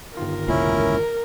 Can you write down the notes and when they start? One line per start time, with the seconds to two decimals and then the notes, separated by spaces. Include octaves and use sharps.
0.17 G1 D#3 F4 A#4
0.48 E1 C#2 A#2 C#4 E4